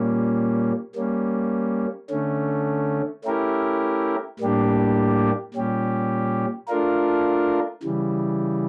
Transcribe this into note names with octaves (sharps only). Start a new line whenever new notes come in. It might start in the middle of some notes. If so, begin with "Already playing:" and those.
Already playing: A#2 G3 A#3 C#4
G3 A#3 C#4
D3 A3 C#4
A3 C#4 E4 G4 A#4
A2 G3 A#3 D4 G4
A#2 G3 C#4 G4
A3 D4 F4 A#4
C#3 E3 G3